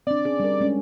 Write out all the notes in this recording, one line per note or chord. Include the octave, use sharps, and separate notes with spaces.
C4 D4 D5
C#4 G#4
G3 A#4
G#3 C#4 D4